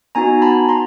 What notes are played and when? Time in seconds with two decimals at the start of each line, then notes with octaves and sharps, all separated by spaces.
0.15 B3 D#4 F#4 G#5 A#5
0.42 A5 B5
0.69 A#5 C6